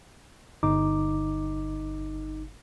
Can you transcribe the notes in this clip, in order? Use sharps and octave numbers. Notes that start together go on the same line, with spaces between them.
G1 D#4 D6